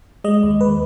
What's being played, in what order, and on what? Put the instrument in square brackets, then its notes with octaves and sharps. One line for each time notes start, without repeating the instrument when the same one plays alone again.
[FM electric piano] G#3 D#5
D#2
D#2 B4